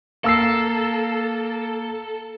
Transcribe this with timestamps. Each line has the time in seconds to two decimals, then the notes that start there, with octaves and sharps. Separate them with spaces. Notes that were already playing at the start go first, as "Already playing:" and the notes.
0.24 A#3 A4 E6 C7